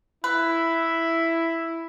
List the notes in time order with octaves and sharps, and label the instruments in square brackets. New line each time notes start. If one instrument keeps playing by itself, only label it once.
[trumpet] E4 [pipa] B4